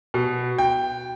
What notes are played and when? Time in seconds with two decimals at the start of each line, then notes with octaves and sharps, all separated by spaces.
0.14 B2
0.58 G5